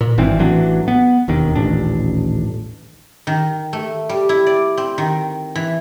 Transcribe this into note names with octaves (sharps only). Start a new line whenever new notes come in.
A#2
G#1 G2 E3 C4
A1 E3 F#3 D4
B3
E1 D#2 D#3
D#1 A1 D4
D#3
A3
G3
E4
D5
C4
D#3
E3